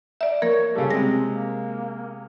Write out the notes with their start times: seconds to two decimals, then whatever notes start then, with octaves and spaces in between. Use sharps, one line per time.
0.21 D5 E5
0.42 F3 A#3 A#4 C#5
0.75 C#3 G3 A4
0.90 C3 G#3 C4 A#6
1.26 A#3